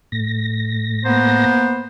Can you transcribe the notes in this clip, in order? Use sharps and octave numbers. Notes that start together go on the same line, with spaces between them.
A2 A#6
A#3 B3 C5